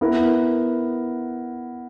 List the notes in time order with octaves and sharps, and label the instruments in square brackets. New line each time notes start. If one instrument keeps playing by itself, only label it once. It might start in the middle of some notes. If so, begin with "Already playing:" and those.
[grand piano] B3 E4 A#4